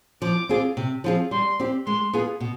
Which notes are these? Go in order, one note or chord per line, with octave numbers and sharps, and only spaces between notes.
F3 D6
C4 F4 G#4
C3
F3 C4 F4 G#4
G3 C6
C4 G4
G#3 C6
B3 F4 G#4
B2